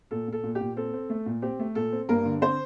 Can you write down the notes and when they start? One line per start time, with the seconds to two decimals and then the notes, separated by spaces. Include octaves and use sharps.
0.11 A#2 A4
0.28 A#2 A4
0.44 A#2
0.55 G4
0.61 A#2
0.77 C4 A4
0.94 C4
1.10 A3
1.26 A#2
1.42 C4 G4
1.59 A3
1.75 A#2 A4
1.92 C4
2.09 G2 A#3 A#4
2.25 D3
2.42 C4 C5